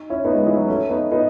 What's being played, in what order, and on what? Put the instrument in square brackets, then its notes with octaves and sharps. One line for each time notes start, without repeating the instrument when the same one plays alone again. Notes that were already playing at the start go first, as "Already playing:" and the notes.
Already playing: [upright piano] D#4
C#4 E4
B3 D#4
G#3 B3
E3 G#3
F#3
A3 C#4
B3 D#4
B3 D#4